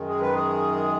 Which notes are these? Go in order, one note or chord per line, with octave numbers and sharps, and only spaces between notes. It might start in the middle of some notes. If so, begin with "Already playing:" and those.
Already playing: F#2 D#3 G#3
G#4
B4
G#4